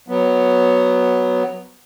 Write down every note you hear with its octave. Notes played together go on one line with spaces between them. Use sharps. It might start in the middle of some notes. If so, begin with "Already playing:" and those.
F#3 B3